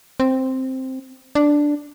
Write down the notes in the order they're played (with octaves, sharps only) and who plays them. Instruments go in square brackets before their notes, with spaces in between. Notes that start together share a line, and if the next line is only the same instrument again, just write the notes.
[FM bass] C4
D4